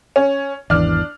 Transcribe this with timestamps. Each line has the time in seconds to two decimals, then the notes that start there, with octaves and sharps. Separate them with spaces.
0.16 C#4
0.70 G#1 E2 E3 D4 F6